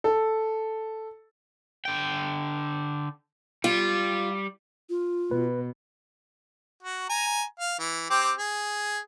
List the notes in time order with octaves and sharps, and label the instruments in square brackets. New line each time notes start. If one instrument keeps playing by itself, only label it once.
[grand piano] A4
[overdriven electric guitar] D3 G5
[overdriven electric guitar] G3 [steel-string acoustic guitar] F4
[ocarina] F4
[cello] B2 [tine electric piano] B4
[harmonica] F#4
G#5 A#5
F5
E3
C4 G4 D6
G#4